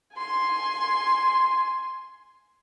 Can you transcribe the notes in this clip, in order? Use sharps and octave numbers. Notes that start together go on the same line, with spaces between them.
G#5 C6